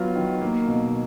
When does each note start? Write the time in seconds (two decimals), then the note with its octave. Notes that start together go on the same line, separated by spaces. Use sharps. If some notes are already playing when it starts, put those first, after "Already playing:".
Already playing: F#3 B3 F4
0.16 D#3
0.41 A#3
0.68 B2